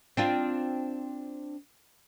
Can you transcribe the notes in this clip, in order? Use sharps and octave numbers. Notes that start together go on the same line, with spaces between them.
C4 D4 F4